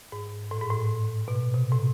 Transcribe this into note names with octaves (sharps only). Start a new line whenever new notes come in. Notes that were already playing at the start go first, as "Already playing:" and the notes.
G#2
A2
G#2
A2
B2
C3
A2